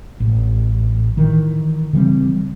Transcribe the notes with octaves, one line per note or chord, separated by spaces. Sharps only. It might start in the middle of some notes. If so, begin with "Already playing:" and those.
A1
D#3 E3
C#3 E3 G3 C4